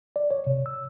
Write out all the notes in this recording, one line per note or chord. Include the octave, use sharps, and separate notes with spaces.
D5
C#5
C3
E6